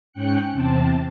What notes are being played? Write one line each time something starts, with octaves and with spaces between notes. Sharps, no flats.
G#2 C#4 G5 F#6 C#7
E2 C3 C4 A5